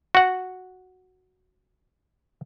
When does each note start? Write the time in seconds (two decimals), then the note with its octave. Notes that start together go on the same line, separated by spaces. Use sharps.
0.15 F#4 F#5